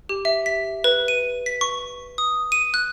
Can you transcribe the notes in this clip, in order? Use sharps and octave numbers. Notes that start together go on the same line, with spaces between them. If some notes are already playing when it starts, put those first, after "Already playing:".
G4
E5
B6
B4
D#7
B6
C#6
D#6
D#7
F#6